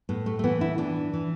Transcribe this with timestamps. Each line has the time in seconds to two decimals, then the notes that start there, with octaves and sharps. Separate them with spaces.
0.09 A2 B3
0.26 A3
0.39 A3
0.44 E3 B3
0.61 E4
0.78 E3 D4
1.14 E3